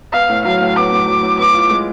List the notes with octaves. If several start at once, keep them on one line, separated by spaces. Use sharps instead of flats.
B3 F5
A2
F#3 F5
A2
B3 D6
A2
F#3
A2
B3 D6
F4
G#3